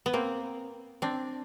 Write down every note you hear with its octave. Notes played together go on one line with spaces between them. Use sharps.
B3
A#3 C4
C4 D4